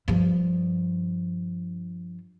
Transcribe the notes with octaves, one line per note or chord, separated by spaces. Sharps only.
G2 F3